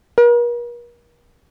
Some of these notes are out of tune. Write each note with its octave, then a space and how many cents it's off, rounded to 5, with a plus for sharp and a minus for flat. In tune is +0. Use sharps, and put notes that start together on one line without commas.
A#4 +45